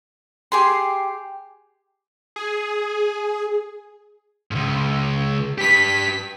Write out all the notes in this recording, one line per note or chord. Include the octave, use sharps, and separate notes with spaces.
G4 G#4 C6
G#4
C#2 G#2
G4 B4 B6